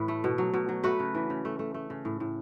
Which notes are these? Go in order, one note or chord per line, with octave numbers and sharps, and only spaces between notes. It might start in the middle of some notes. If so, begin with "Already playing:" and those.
Already playing: A2 E3 B4
A3
B2
F#3
B2
F#3
A3 F#4 B4
C#3
E3
C#3
A3
A3
A3
C#3
A2
A2